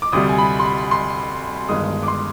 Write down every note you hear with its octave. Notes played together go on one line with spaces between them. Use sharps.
D6
D2 C3 G3 D#6
G#5
B5
C6
B5
C6
G1 G2 D#3 G#3 D#6
D6
C6